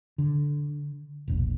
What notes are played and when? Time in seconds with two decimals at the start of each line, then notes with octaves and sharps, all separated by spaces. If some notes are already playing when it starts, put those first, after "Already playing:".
0.18 D3
1.28 E1 A#1